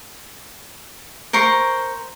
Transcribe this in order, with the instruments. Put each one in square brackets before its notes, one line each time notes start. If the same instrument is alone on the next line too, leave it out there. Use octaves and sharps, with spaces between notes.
[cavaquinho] A#4 C5 C#6